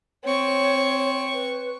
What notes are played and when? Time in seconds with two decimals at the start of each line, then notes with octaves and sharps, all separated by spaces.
0.24 C4 C#5 C#6
1.34 B4